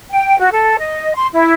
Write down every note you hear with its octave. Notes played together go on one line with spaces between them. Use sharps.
G5
F#4
A4
D#5
C6
E4